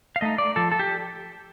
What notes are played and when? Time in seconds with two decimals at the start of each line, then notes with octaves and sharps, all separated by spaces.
0.16 F5
0.21 A3 D#4 D#5
0.38 D5
0.56 F3 A4
0.72 A4
0.79 G4